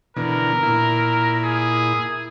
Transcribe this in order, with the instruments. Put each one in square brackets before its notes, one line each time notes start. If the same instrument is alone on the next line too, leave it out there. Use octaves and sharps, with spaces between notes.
[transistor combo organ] B2 D3 E3 [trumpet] A#4
[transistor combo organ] A#2 E4
[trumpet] G#4